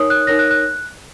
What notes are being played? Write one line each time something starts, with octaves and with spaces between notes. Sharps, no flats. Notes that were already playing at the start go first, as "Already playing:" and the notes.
Already playing: D#4 A#4 C#5 D#6
F#6
D#4 A#4 C#5 A#6
F#6
F#6